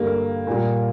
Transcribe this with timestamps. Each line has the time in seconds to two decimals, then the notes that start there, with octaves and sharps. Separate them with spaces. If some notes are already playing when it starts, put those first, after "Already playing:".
Already playing: G2 D3 G3 A#3
0.47 A#2 G3